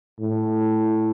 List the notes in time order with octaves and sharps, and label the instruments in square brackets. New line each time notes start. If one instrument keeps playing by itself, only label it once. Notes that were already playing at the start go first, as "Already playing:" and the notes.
[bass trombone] A2